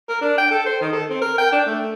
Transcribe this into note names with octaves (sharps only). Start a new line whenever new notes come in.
A#4
D4
G5
A4
C5
D#3
A4
C4
A#4
G5
D4
A3